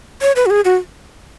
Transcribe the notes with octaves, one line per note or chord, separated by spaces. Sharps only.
C#5
B4
F#4
G#4
F#4